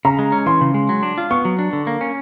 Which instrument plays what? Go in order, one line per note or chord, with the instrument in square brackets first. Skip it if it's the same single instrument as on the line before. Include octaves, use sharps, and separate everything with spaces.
[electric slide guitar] C#3 [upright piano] A#5
[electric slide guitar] G#3
C#4
[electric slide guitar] E3 [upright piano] C6
[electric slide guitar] C#3
G#3
F#3
D4
F4
[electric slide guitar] B3 [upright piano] C#6
[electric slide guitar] F#3
D4
D3
A#3
C#4